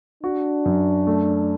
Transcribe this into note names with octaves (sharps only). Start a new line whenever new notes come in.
D4 F#4
F#2
A3